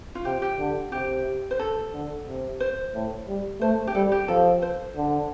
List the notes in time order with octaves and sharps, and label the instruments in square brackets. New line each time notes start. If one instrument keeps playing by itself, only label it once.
[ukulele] F4
[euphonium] C3 [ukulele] G4
[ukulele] G4
[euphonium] D3
[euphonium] C3 [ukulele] G4
[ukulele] C5
A4
[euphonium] D3
C3
[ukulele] C5
[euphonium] A2
G3
[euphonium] A3 [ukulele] C5
[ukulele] G4
[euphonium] G3 [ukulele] A4
[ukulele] G4
[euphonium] F3 [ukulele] A4
[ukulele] C5
[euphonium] D3